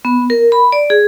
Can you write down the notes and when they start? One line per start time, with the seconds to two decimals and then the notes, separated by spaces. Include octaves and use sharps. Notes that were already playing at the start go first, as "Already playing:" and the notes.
0.05 B3
0.30 A#4
0.52 B5
0.72 D5
0.90 G#4